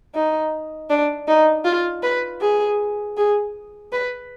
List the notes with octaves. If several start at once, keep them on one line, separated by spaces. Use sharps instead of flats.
D#4
D4
D#4
F4
B4
G#4
G#4
B4